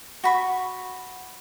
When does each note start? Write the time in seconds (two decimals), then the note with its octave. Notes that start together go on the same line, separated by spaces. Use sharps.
0.24 F#4 B5 C#6